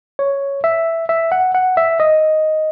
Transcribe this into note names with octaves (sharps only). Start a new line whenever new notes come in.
C#5
E5
E5
F#5
F#5
E5
D#5